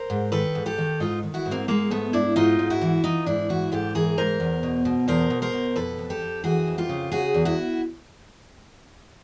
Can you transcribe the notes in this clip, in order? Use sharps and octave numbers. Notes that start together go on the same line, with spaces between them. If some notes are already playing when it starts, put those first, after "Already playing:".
Already playing: A#4 C5
G#2
D#3 A4 B4
G#2
G4 A4
D#3
G#2 D#4 F4
D#3
E4 F#4
G#2
A#3 C4
G#2 G#3 A#3
G#2 A3 B3
G#2 D4 E4
G#2 D#4 F4
G#2
E4 F#4
E3
E3 D#4 F4
G#2 D4 E4
E3 E4 F#4
G#2 G4 A4
E3 G#4 A#4
G#2 A#4 C5
E2
B2
B2
E2 A#4 C5
B2
A#4 C5
B2
F2 A4 B4
F2
G4 A4
F2
E3 F#4 G#4
F2
F4 G4
C#3
C#3 F#4 G#4
E2
E4 F#4